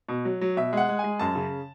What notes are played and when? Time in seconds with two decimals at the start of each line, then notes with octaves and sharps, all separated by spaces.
0.08 B2
0.25 F#3
0.41 F#3
0.57 B2 E5
0.73 G#3 F#5
0.89 G#3
0.99 G#3 G#5
1.19 F#2 A5
1.35 C#3